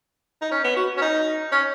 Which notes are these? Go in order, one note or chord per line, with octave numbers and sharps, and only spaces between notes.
D#4
C#4
B3
F#4
C#4
D#4
C#4